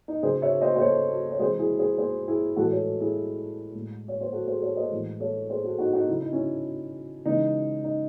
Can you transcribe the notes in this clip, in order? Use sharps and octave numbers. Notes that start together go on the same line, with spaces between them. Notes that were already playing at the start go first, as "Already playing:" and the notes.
D#4
C#3 F#3 G#4 C5
C#5 E5
C5 D#5
C5
A4 C#5
C#5
C3 E3 G#3 G#4 C5
E4 G#4
G#4 C5
G#4 C5
E4 G#4
A2 E3 G#3 F#4 A4
A4 C#5
E4 G#4
A2 G#3
C#5
C5
F#4 A4
G#4 C5
A4 C#5
C5 D#5
A2 E3 G#3
A4 C#5
G#4 C5
F#4 A4
D#4 F#4
D#4 F#4
C#3 F#3 E4
D#4
C#4 E4
C#3 E3 G#3 D#4
D#4